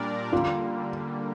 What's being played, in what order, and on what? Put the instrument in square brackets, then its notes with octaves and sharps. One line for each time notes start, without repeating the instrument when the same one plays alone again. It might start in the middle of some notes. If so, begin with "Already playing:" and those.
Already playing: [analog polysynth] A#2 G3 D4 A#4 D5
[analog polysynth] D3 G3 A#3 [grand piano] F4